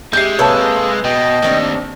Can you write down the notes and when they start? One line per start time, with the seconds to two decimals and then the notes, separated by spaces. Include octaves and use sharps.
0.13 G#3 G4 E5 G6 C7
0.39 C3 A#3 G#4 A4 B4 C#5 A5
1.04 B2 D#5 G5
1.43 D#2 A3 C4 D4